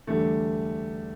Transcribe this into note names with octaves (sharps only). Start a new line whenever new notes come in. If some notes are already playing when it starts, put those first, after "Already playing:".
E2 D3 G3 A3